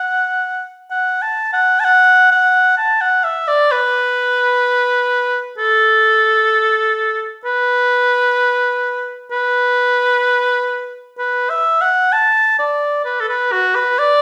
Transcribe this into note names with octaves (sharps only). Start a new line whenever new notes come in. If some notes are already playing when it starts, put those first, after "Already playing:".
Already playing: F#5
F#5
A5
F#5
A5
F#5
F#5
A5
F#5
E5
D5
B4
A4
B4
B4
B4
E5
F#5
A5
D5
B4
A4
B4
F#4
B4
D5